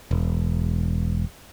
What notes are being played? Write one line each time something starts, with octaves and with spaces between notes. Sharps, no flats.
E1